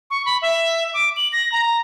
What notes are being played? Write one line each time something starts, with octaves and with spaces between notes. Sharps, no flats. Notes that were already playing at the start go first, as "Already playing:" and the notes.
C#6
B5
E5
D6
F#7
A#6
A#5